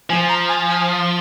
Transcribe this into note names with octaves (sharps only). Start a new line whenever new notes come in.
F3 G#5
A#5
G#5
G#5